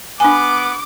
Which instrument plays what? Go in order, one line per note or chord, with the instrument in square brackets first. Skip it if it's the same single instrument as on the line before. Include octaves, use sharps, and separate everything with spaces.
[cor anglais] B3 [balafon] D4 G#5 [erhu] D6